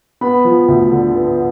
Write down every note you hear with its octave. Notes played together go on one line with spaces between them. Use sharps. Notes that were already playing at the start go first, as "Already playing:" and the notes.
B3 B5
F3
D2
D3
B3